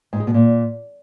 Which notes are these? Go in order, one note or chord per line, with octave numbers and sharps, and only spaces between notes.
G#2
G#3
B2
A#2